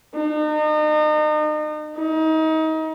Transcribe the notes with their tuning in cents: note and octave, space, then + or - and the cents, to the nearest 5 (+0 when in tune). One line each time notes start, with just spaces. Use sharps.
D#4 -35
D#4 +30